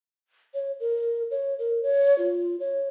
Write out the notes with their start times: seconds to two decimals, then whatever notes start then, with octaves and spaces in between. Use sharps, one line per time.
0.54 C#5
0.80 A#4
1.31 C#5
1.59 A#4
1.83 C#5
2.18 F4
2.60 C#5